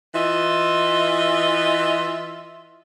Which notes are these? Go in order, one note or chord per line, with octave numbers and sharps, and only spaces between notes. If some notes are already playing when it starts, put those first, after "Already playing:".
E3 F4 D#5 E5